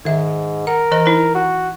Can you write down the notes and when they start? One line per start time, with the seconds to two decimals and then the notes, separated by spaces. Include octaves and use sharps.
0.05 G#2 D#3 E5
0.67 A#4 F#5
0.91 E3 C5 D#5
1.06 D#4 E4 C5
1.35 F#4